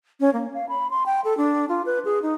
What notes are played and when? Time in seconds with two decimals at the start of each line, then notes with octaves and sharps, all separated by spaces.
0.20 C#4
0.33 A#3
0.54 F5
0.69 B5
0.90 C6
1.06 G5
1.25 A4
1.37 D4
1.69 F4
1.86 B4
2.05 G#4
2.22 D#4